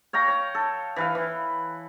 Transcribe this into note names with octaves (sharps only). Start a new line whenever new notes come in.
C#5 F5 G5 A#5
C#5
A4
E3 B4 F5
E3